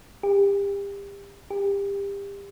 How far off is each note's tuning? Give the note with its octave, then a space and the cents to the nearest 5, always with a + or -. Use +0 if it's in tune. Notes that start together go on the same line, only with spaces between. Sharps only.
G4 +30
G4 +30